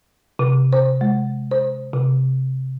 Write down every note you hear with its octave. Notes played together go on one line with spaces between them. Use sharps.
C3
C5
G#3
C5
C3